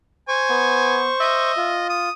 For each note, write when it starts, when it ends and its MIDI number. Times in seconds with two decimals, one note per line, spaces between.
0.28 1.52 72
0.28 1.00 80
0.28 1.52 85
0.50 1.11 59
1.20 1.89 75
1.20 1.77 76
1.57 2.09 65
1.89 2.12 87